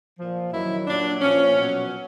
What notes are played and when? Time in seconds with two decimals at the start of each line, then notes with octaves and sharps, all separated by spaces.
0.18 A#2 F3
0.52 F#2 D#3 F#3 E4
0.87 A#2 F#3 D4
1.21 A#2 F3 C#4
1.56 B2 F#3